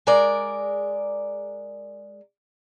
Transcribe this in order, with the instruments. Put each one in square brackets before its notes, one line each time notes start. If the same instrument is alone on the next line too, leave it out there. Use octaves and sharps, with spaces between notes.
[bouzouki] G#3 A#4 D5